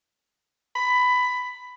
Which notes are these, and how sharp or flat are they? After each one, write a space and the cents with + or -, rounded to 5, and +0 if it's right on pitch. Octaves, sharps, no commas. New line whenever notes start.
B5 +15